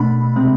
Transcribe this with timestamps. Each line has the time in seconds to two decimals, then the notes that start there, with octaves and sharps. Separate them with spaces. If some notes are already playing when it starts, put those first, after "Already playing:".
Already playing: B2 A3 D4 B5
0.36 C3 G#3 C4